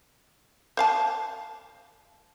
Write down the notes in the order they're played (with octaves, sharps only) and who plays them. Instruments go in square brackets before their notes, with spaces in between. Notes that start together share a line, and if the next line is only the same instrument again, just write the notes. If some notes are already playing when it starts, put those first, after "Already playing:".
[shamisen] C5 F5 A5